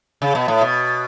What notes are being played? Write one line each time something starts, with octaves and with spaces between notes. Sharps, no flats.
C#3
B2
A2
B2